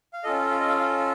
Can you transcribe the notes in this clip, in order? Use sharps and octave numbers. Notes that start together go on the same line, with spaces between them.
F5
C#4 F4 A4 D#5
F5
D#5
F5
F5